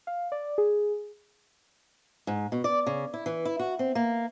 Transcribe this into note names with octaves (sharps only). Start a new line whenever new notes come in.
F5
D5
G#4
G#2
B2
D5
C#3
E4
E3
E4
F#4
C4
A#3